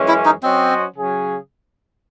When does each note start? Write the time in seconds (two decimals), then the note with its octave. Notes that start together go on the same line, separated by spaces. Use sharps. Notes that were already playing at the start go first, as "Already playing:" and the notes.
Already playing: F#2 E3 G#3 C#4
0.08 E4
0.26 D#4
0.43 F#3 C4 C#4 F#4 C5 D#5
0.95 C#3 F#3 C#4 G#4